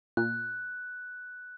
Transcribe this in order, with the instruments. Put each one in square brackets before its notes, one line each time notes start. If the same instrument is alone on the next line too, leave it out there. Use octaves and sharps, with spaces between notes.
[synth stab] A#2 [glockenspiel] F#6